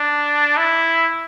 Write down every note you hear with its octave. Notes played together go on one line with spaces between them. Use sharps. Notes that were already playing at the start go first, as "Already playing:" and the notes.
Already playing: D4
E4